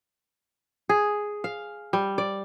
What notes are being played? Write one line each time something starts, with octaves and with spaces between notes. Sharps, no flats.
G#4
F5
G3
D5